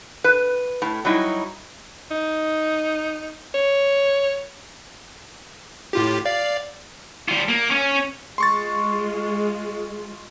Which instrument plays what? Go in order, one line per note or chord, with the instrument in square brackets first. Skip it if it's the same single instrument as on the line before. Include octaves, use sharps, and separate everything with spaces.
[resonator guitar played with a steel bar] B4
A2
F#3 G3 D#4 E4
[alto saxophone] D#4
C#5
[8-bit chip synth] A2 F4 G4
D5 F5
[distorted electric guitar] G3 F4
A#3
C#4
[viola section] G#3 F4 [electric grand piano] C6 C#6 A6